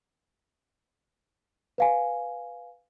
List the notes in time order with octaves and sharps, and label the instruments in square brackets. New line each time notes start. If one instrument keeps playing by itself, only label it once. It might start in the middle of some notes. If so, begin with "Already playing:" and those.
[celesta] B4 F5 G#5